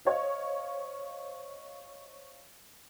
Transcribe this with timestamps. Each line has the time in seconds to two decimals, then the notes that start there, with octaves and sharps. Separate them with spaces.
0.05 C5 C#5 D#5 F5